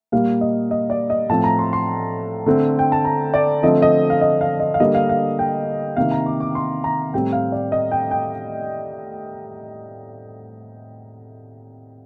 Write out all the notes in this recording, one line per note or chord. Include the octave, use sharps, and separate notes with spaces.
A#2 G3 A#3 F5
D#5
D#5
D5
D#5
A2 F3 C4 A5
A#5
C6
C6
D3 A3 C4
G5
A5
A#5
D5
D3 F3 A3 C4 D#5
D#5
F5
D#5
F5
D#5
F5
D3 G3 A#3 D#5
F5
F5
G5
C3 D#3 A#3 F5
A#5
D6
D6
C6
A#5
A2 G3 C4 G5
F5
D5
D#5
G5
G5